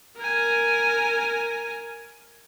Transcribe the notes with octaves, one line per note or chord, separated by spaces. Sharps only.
A#4 G#5